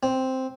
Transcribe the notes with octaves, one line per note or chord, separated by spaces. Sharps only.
C4